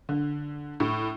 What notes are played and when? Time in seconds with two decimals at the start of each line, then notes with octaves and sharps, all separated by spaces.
0.09 D3
0.80 A2